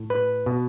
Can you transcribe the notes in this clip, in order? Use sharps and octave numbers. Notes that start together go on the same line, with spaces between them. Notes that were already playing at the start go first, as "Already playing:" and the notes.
Already playing: A2
B4
B2